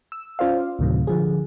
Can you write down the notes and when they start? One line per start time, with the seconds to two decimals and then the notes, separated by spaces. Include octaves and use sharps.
0.12 E6
0.39 C#4 F4 C5 D5 F5
0.79 D2 A2 C3 D#3 F#3
1.07 D3 F3 G#4